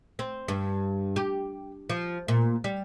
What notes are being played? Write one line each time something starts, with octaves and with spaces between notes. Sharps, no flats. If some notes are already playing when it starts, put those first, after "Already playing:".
C4
G2
G4
F3
A#2
G3